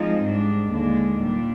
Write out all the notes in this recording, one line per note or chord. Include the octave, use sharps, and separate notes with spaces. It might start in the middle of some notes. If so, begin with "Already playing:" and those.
Already playing: F3 G#3 C4 D#4
G#2 G3 D4
D#2 D3 G#3 D4
A#2 G3 D4